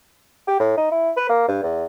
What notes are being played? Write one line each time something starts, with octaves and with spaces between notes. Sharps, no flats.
G4
A2
D#4
E4
B4
A#3
G2
E2